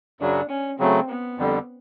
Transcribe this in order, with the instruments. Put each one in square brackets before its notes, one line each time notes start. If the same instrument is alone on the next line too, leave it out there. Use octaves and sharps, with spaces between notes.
[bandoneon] F#2 C#3 F#3 [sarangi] D4
[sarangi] C#4
[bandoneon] C#3 F#3 A3 [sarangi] C4
[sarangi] B3
[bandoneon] F2 D3 G3